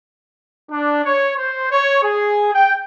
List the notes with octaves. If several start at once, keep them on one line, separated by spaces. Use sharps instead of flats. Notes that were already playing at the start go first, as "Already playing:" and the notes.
D4
C#5
C5
C#5
G#4
G5